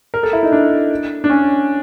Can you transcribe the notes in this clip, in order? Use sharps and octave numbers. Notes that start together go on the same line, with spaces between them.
A#4
A4
E4
D#4
D4
D4
C#4